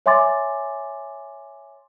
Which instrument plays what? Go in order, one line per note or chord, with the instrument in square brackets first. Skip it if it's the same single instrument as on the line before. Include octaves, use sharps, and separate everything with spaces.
[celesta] C#5 E5 G#5 C6 D6 A6